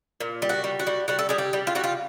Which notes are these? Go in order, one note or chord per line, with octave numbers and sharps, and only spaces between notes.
A#2
G3
F#4
G3
F#4
G3
G3 F#4
A4
G3 G#4
G4
G3
F4
G3 F#4
F4